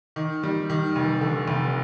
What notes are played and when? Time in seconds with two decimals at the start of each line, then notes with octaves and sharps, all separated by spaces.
0.16 D#3
0.44 G3
0.70 D#3
0.96 F1
1.21 D3
1.47 F1